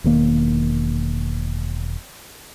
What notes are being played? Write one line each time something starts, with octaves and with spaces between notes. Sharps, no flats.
E1 D#3 A#3